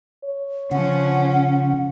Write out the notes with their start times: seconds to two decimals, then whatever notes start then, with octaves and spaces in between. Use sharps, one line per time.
0.24 C#5
0.71 C#3 F3 C#4 F#5